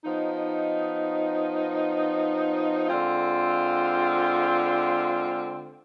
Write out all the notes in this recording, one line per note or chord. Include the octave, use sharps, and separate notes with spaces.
F3 B3 D#4
D3 G#3 C4 F4